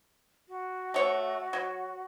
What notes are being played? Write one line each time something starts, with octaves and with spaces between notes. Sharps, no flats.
F#4
A3 C#5
F#3